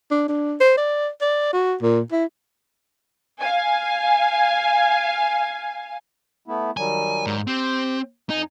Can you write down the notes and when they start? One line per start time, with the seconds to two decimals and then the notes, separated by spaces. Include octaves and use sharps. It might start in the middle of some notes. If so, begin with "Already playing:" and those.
0.11 D4
0.28 D4
0.60 C5
0.77 D5
1.21 D5
1.53 F#4
1.82 A#2
2.12 E4
3.40 F5 G#5
6.48 A3 B3 E4
6.77 D#3 F#3 G3 G#5
7.27 G#2
7.47 C4 G4 C5
8.30 F2 D#4 G#5 A#5